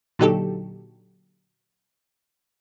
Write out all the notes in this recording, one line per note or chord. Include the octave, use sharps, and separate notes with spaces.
A#2 D3 F#3 D#4 G4 A4